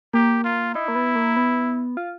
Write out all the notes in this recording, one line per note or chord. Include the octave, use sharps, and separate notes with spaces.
A#3 G4
F4
D#4 E4
A#3
B3
A#3
B3
F4